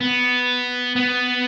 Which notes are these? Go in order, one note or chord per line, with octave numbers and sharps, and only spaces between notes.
B3
B3